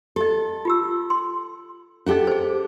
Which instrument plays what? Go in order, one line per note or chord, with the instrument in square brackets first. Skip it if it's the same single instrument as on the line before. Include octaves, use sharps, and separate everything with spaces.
[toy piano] G4 D#5 [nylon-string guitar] A4
[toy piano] F4 G4 E6
C6
[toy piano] C#4 D#5 [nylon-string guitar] G4 A4 F#5
[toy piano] G#4 C5